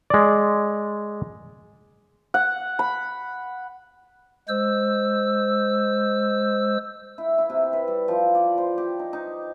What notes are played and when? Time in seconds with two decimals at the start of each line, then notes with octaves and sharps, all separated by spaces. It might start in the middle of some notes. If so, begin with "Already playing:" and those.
0.10 G#3 D5
2.34 F#5
2.79 B5
4.48 G#3 C5 E6
7.18 E4
7.38 E4
7.50 C3
7.73 B4
7.88 G3
8.08 F3
8.35 D5
8.58 C5
8.78 G4
8.99 D#4
9.13 D#4